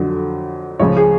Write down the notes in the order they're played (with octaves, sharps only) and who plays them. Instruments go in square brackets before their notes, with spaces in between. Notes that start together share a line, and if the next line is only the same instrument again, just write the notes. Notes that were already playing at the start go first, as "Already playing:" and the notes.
Already playing: [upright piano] F2 D3 F#3
C#2 C#3 F3 C#5
G#4